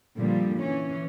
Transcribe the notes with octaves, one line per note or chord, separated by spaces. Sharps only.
A#2 D3 F3 G3
E3 C#4